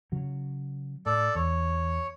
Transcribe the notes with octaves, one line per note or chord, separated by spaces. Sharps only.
C#3 F#3
A2 A4 D5
E2 C#5